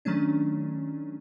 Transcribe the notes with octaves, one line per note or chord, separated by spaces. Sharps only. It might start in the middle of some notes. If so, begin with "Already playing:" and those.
D#3 F#3 A3 C#4 D4